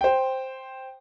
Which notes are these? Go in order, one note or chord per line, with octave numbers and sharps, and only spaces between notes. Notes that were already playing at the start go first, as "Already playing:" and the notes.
C5 G5